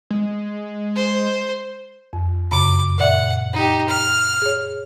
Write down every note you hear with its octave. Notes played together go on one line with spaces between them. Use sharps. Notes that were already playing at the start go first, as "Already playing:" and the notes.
G#3
C5
F2
F#2 C#3 B5 D6
A#2 D5 E5 F#5
D#4 G4
F6
G#4 C#5